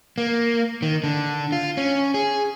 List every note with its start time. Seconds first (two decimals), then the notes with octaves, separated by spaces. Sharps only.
0.18 A#3
0.82 D#3
1.04 D3
1.52 F4
1.77 C#4
2.14 G#4